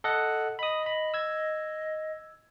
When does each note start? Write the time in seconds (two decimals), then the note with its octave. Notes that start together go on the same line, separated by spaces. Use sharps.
0.04 A4 D#5 F#5
0.59 D#5 B5 D#6
0.86 B5
1.14 E6 G#6